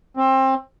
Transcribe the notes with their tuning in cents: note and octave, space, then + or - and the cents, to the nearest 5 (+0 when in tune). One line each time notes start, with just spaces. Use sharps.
C4 +25